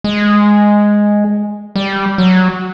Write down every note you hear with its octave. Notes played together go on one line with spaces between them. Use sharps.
G#3
G3
F#3